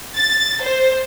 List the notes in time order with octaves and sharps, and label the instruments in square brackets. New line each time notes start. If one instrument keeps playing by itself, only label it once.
[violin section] A6
C5